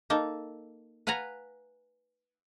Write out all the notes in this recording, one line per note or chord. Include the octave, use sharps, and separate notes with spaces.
A#3 D#4 A4
B4 F5 F#5 G#5 A#5